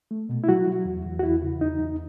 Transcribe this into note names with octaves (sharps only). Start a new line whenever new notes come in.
A3
B2
E4
F#3 F#4
F#3
E2
E2
F#4
E2 E4
C#3
E2 D#4
E2